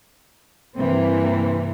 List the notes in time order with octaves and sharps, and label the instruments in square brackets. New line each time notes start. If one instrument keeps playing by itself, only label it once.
[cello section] G2 C3 E3 A#3 C4